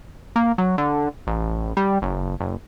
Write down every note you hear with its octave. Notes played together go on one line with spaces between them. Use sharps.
A#3
F#3
D3
A1
G3
F#1
F#1